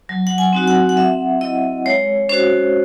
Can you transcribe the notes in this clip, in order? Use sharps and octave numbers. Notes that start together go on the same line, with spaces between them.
F#3
F#5
G#5
C4 D#4 F#4
F#5
F#5
C4 E5
E4 D#5
G#3 C#5
C#4 F#4 C5